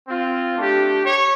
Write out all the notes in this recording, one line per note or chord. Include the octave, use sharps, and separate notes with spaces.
C4 F4
A3 D4 G4
C#5